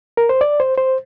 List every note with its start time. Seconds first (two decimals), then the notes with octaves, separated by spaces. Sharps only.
0.17 A#4
0.29 C5
0.41 D5
0.60 C5
0.78 C5